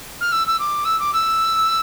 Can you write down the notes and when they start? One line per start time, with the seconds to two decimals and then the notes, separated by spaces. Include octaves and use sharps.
0.20 F6
0.32 E6
0.47 E6
0.59 D6
0.85 E6
0.99 D6
1.13 E6